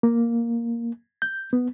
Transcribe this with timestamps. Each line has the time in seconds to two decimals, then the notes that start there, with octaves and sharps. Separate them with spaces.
0.03 A#3
1.22 G6
1.53 B3